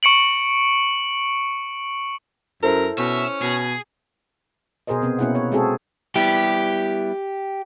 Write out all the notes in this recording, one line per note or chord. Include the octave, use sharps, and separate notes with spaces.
C#6 C#7 D7 F#7
F#2 E4 A4 A#4 C5
B2 C#4 E5
B2 G#4
B2 G#4 A#4 C5 D#5
C3 B3 C4
B2 A#3 C#4 E4 G#4 F#5
C#5
G#3 C4 F#4 G#4 A4
G3 B3 E4 G4